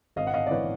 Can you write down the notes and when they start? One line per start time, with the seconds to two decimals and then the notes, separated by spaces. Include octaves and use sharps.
0.16 G#1 D#5 F5
0.27 F#5
0.34 D#5 F5
0.47 D5
0.51 E3 B4 C#5